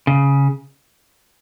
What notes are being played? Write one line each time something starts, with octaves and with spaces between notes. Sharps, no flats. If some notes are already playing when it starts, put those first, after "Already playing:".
C#3